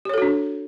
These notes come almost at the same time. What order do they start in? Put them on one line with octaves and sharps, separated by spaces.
G4 C#5 A4 F#4 D4